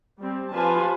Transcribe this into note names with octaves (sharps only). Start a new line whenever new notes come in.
G3 C4
F3 F4 G4 B4 G#5 A5